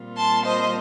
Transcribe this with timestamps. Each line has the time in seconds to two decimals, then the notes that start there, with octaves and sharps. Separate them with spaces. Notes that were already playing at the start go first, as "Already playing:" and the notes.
Already playing: A#2 G3 C4 F4
0.16 A5 C6
0.45 C5 D#5